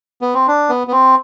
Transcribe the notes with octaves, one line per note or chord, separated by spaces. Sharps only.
B3
C4
D4
B3
B3
C4